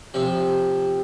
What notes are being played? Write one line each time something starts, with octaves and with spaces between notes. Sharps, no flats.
C3 F3 C4